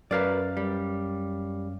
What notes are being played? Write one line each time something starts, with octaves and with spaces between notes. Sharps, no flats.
F#2 A#4 B4 D5 F5
G3